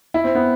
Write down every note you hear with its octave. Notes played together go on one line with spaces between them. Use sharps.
E4
C4
B3